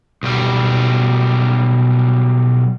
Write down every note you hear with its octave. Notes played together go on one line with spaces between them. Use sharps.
B1 G3